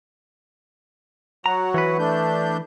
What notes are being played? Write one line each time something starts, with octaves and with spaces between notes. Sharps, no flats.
F#3 F#4 A#5
E3 B4
A3 D4 G6